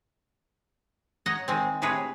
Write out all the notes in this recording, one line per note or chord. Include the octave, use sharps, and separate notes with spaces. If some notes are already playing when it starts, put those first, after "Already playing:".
C#5 D#5 F#5 A#5
D#3 G#3 C4
A2 C3 G#3 G#4 B4 C#5